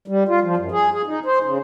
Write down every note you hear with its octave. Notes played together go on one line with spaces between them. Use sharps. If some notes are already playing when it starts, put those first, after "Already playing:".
G3
F4
F3
F#2
G#4
G#4
D#4
C5
C#3